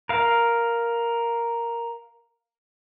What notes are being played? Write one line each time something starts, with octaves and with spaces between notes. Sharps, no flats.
A#4 F5